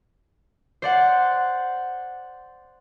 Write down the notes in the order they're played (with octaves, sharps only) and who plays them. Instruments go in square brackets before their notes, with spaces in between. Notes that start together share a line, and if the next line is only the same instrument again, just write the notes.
[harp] C5 D5 F#5